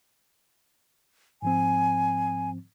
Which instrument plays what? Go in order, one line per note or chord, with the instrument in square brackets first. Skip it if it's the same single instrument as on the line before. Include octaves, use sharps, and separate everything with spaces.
[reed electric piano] G#2 F3 C4 [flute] G#5